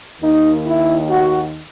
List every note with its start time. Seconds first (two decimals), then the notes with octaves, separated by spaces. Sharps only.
0.21 D#2 D#3 D#4
0.65 E4
1.08 F#4